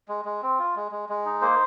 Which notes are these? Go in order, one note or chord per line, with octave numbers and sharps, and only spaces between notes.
G#3
G#3
C4
F4
G#3
G#3
G#3
D#4
A#3 C5